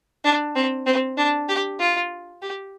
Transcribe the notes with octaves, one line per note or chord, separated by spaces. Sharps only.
D4
C4
C4
D4
G4
F4
G4